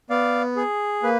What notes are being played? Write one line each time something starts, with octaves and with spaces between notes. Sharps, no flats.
B3 D5 F5
G#4
A#3 B4